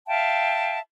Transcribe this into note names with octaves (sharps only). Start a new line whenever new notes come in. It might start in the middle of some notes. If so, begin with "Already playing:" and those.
E5 F5 G5 A5